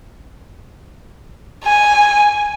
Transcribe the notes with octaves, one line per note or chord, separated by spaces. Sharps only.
G#5